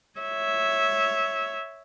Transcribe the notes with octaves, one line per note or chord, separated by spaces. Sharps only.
C#5 E5